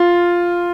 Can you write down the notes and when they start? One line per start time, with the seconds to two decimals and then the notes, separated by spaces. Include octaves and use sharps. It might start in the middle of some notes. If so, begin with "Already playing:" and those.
Already playing: F4